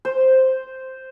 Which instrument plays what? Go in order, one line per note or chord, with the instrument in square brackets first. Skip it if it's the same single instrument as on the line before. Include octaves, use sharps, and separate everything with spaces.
[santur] C5